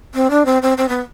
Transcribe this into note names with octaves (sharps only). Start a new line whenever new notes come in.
C4
D4
C4
C4
C4
B3